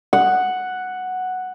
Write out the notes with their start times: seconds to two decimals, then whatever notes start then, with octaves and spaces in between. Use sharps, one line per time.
0.13 F#5